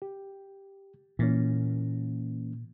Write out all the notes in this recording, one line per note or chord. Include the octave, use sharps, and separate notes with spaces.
G4
A#2 E3 A#3 C#4